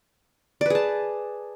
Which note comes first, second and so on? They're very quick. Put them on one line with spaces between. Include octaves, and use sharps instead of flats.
D5 B4 G#4 A5